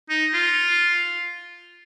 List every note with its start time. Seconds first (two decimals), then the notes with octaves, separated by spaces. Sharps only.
0.09 D#4
0.34 F4